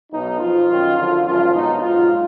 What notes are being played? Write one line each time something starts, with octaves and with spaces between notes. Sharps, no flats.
B1 B2 F#3 D#4
F2 F3 F4
F#2 D#3 F#3
F#2 D3 F3
G#1 F#2 F3 F4
B1 B2 F#3 D#4
A#1 G#2 F#3 F4